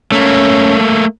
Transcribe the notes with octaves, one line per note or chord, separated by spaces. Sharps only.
A3 A#3 C#4